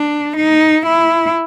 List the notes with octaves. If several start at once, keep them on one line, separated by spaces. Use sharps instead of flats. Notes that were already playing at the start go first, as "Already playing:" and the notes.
Already playing: D4
D#4
E4